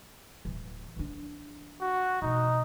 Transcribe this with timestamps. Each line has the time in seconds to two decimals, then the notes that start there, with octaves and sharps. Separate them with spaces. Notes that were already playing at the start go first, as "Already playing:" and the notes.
0.45 D1 E3
0.96 E3 D4
1.81 F#4
2.22 B2 E3 D#4